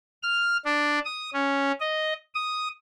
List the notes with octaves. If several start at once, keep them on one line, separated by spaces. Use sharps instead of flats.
F6
D4
D#6
C#4
D#5
D#6